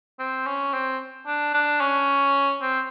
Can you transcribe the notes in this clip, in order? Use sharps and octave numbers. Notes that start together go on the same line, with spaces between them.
C4
C#4
C4
D4
D4
C#4
C4